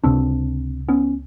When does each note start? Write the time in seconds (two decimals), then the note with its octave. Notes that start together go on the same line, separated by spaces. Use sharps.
0.04 C#2 C3 C4 D4
0.88 B3 C#4